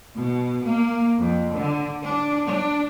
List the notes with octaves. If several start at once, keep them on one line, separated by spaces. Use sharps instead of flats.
B2
A#3
F2
D3
D4
D4